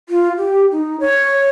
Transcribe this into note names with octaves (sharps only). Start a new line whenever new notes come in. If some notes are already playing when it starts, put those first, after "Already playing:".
F4
G4
D#4
C#5